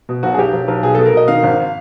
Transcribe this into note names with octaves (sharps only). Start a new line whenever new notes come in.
B2
B1 F#4
G#4
B1 G4
B1
B1
B2 G#4
B2 A4
A#4
B2 D#5
D#3 F5
G#1